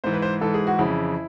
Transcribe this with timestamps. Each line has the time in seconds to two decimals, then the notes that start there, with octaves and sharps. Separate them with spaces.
0.04 G#2 E3 C5
0.13 B4
0.22 C5
0.41 G#2 E3 A4
0.54 G#4
0.67 F#4
0.79 F2 C#3 E3 E4